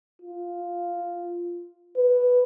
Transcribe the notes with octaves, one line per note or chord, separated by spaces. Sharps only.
F4
B4